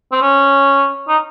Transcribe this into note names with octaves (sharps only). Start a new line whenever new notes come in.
C4
C#4
D#4